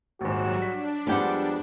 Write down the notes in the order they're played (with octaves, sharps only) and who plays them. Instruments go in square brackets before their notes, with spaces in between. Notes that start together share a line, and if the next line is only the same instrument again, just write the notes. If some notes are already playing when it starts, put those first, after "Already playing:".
[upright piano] A#1 D#2 G#2 [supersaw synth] F#3 G3 E7 [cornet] F#4
[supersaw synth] D4 [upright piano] B6
[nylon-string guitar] F2 G4 F#5 [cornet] G3 [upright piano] G#3 B3